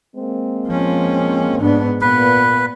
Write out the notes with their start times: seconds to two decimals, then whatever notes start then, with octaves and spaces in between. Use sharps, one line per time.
0.16 G#3 A#3 C4
0.67 F3 C#4
1.60 G#2 B3 D4
2.01 A#2 B3 B4